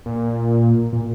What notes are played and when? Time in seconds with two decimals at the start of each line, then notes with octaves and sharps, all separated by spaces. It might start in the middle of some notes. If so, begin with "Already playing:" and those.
0.06 A#2
0.93 A#2